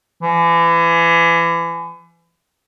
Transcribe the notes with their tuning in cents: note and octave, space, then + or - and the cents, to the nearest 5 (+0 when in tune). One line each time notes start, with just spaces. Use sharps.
E3 +35